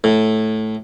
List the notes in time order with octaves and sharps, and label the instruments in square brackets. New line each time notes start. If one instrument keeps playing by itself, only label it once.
[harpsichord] A2